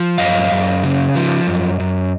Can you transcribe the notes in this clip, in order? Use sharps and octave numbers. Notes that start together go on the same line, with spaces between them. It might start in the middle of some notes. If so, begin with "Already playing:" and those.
Already playing: F3
F#2 D#5 F5
F#2
C#3
F3
F#2
F#2